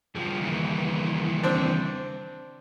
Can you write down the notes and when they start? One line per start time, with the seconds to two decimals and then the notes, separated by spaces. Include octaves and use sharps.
0.15 G2 C#3 F3 G3 G#4
0.41 D#2 E3
1.43 C4 D4